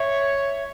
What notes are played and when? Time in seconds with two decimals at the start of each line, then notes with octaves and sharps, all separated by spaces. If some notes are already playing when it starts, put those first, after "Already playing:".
Already playing: C#5 E5